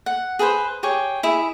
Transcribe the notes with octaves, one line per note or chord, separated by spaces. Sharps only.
F#5
G#4 A4 B4 C5
G4 G#4 C#5
E4 G#4 E5